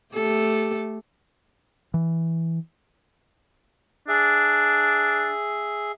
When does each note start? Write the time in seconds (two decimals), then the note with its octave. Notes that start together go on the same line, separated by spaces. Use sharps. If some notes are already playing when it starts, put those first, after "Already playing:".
0.15 A3 G4 A4
1.94 E3
4.08 D4 G#4 E5